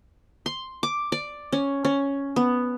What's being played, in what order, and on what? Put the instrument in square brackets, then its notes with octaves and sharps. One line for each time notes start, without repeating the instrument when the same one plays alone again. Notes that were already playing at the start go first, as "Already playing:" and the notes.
[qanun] C6
D6
D5
C#4
C#4
B3